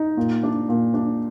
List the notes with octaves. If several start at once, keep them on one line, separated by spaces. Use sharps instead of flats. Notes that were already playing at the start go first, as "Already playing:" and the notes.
Already playing: D#4
A#2
D4
A#2
D4